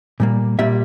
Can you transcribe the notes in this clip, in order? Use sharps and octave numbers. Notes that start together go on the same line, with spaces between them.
A#2 G3 A#3
A#2 G3 A#3 E5